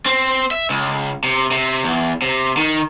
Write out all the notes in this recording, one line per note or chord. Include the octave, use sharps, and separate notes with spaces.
C4
E5
C#2
C3
C3
E2
C3
D#3